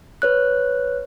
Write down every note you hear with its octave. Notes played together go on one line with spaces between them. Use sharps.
B4 C#5 F#6